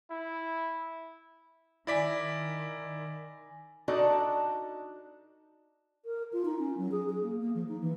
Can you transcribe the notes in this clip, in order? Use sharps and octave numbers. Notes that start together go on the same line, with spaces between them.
E4
D#3 E4 D5 G#5 D6 A#6 B6
D4 D#4 F#4 A4 D5 D#5
A#4
F4
D#4
C#4
F#3
G#4
G#4
A#3
A#3
F3
D#4
E3